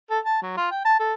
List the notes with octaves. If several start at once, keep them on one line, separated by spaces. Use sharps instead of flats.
A4
A5
F#3
F4
G5
A5
A4